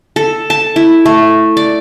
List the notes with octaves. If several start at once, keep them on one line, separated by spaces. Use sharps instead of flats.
A4
A5
E4
A3
D5